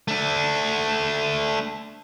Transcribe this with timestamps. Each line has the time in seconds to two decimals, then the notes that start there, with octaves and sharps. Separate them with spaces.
0.08 A3 D4